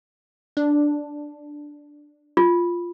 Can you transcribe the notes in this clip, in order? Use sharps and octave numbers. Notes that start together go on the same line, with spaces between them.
D4
F4